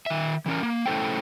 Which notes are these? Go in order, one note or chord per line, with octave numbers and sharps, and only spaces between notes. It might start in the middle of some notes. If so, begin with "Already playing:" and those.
D#3 E5
E3 C#4 A#4
A#3
A3 C#4 E4 A4 C5 G5